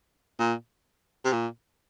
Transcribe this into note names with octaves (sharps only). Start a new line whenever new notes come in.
A#2
C3
A#2